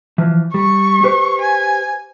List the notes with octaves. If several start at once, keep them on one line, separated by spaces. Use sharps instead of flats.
E3 F3
G3 C#6
G4 B4 C5
G#5